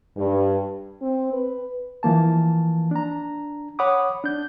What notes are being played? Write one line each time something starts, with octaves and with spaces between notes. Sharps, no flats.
G2
C4
B4
E3 F3 A#3 A5
D4 A#5
C#5 F#5 B5 D6 D#6
D4 G6